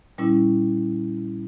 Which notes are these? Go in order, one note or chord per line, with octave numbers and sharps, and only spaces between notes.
A#2 G3 C#4 E4